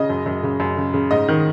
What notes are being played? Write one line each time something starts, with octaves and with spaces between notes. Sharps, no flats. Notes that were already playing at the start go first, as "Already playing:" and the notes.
Already playing: C#3 D#5
F#2
F#2
C#3
F#2
C#3
C#3
G#2 D#5
D#3